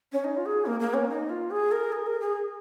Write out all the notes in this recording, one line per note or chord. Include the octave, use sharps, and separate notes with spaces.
C#4
D#4
F4
G#4
A#3
A#3
C#4
D#4
F4
G#4
A#4
G#4
A#4
G#4